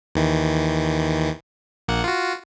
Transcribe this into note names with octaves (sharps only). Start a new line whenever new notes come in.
D#2 D#3 E3
A#1 A#3 F#5
F4 F#4